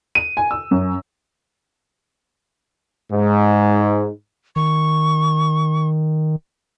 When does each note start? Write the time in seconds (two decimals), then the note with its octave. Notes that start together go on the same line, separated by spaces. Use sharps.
0.15 D#7
0.37 G#5
0.51 E6
0.71 F#2
3.12 G#2
4.56 D#3 C#6